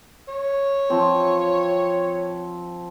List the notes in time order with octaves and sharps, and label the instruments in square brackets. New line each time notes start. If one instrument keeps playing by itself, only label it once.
[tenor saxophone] C#5
[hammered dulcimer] F3 C4 C5